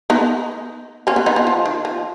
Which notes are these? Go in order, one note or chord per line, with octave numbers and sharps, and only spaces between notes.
B3 D#4
A#3 C#4
B3
B3 D#4
F3
F3
D#3
F3